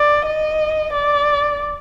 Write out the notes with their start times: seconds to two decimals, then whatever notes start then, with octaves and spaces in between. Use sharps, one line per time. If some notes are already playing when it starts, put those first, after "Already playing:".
Already playing: D5
0.26 D#5
0.93 D5